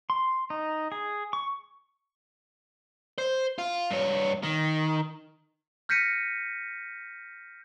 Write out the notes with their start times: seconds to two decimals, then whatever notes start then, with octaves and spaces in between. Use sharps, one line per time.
0.10 C6
0.50 D#4
0.92 G#4
1.33 C#6
3.18 C5
3.58 F4
3.91 G2 C#5
4.43 D#3
5.89 F6 G6 A#6 B6 C#7 D#7